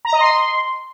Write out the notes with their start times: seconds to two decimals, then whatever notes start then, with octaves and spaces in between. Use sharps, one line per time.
0.05 A#5
0.13 D#5
0.20 C6